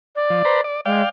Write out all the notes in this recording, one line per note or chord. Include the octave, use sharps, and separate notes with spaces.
D5
F3
B4 C5 A#5
D5
G#3 D5 F5 G5